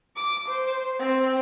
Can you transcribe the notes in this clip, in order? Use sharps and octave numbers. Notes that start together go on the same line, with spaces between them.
D6
C5
C4